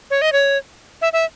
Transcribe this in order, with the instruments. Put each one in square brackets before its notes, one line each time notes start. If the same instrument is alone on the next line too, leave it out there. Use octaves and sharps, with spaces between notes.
[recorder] C#5
D#5
C#5
E5
E5